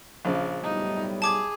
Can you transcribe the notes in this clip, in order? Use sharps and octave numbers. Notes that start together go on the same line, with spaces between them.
A#1 C#3 F3
B1 A2 G3 D#4
G#4 A5 D6 G#6